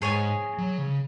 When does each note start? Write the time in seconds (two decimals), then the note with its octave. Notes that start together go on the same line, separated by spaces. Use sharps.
0.02 G#2 G#4 C#5 G#5
0.58 F#3
0.78 C#3